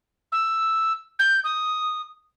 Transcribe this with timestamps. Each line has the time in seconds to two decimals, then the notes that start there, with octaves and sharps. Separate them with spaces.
0.32 E6
1.19 G6
1.44 D#6